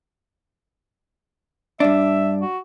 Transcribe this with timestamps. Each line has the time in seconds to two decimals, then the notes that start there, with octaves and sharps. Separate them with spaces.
1.80 G2 D4 E5
2.42 F#4